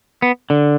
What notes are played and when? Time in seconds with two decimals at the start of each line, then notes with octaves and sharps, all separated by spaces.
0.22 B3
0.50 D3